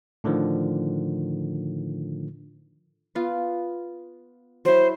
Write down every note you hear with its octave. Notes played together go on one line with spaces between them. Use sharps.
A2 D3 D#3 F3
B3 F4
F#3 E4 C5